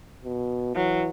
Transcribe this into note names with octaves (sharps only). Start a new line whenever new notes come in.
B2
E3 F#3